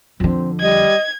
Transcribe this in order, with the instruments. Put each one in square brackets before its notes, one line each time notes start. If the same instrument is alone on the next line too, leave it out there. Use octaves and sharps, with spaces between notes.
[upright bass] F2 D3 [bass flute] C4
[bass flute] G3 [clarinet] D#5 [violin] G#6